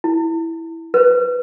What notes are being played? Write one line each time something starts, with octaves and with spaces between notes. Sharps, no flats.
E4
B4 C5